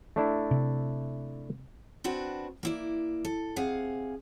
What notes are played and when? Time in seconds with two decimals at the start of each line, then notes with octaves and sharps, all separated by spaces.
0.16 A3 D4 E4
0.51 C3
2.04 C4 D4 F#4 B4
2.63 A#3 E4 D5
3.25 A4
3.56 C3 G#4 F5 F#5